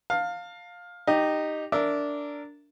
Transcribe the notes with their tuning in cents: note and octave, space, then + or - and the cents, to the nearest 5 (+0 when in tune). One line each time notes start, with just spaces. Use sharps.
F5 +15 A5 +35
D#4 -10 G4 +0
D4 -10 A#4 -15 E5 +0